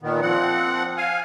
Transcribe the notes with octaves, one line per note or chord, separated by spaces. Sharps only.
A#2 D#3 B3
F3 C4 F#5
F5 G#5